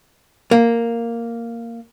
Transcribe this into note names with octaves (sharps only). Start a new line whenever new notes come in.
A#3